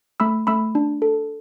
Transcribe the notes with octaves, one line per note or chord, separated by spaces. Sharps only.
A3 B5 E6
A3 B5 E6
D4
A4